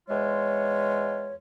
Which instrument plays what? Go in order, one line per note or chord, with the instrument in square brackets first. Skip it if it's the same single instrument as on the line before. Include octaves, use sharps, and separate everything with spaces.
[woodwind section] E2 G#3 F4 C#5